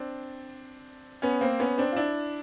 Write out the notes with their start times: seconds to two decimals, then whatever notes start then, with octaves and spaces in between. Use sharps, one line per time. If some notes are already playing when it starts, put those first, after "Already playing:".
Already playing: C4 D4
1.22 B3 C#4
1.41 A#3 C4
1.60 B3 C#4
1.78 C4 D4
1.92 F4
1.97 D4 E4